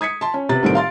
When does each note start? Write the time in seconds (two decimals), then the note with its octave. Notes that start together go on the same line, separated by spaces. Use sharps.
0.01 D#6 G#6 B6 C#7
0.21 A5 C6
0.34 C#4
0.49 C3 B3 A6
0.62 C2 A2 D#3 C4 A4 D7
0.75 F5 C6 A6